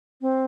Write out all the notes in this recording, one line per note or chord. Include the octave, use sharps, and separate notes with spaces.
C4